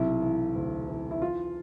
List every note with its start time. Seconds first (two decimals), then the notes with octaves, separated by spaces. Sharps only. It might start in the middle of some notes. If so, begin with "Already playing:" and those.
Already playing: B1 C3 E4
0.22 E3
0.56 D2
0.89 E3
1.11 E4
1.22 E3 F4